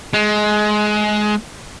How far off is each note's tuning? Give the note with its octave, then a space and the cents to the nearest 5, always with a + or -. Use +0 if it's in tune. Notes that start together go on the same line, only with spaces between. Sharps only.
G#3 +20